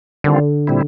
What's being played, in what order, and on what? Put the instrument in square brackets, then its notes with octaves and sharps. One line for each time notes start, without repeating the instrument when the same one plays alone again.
[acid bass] D3 [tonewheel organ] D#3 G3 C4 F4
[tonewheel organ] A#2 G3 C4 E4